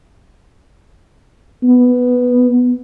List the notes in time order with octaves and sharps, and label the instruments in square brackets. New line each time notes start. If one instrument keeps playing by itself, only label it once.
[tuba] B3